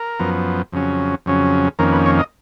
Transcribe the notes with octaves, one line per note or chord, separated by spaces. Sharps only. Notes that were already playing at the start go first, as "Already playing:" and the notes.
Already playing: A#4
F#2 F3 B3
F2 C#3 F#3 C#4
F2 C#3 F#3 C#4
F2 D#3 A#3 C#4 A#4
B4
C#5
D#5